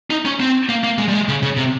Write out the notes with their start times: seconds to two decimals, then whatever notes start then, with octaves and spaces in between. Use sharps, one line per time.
0.10 D#4
0.25 C#4
0.40 C4
0.69 A#3
0.84 A#3
0.98 G#3
1.08 G3
1.14 G#3
1.28 C#3
1.43 C#3
1.57 C3